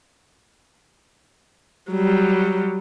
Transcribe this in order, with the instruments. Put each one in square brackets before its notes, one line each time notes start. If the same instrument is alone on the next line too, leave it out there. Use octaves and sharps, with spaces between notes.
[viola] F#3 G3